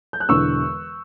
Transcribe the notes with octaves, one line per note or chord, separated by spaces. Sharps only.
G6
F#6
E1 E2 D3 C#6 E6